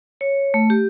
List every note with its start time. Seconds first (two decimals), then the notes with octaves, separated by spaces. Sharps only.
0.21 C#5
0.54 A3
0.70 G4